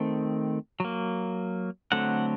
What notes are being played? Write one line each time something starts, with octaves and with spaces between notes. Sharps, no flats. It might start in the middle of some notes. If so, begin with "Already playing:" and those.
Already playing: D#3 A3 C4
F#3 A#3
D3 F#3 A3 C4 F#5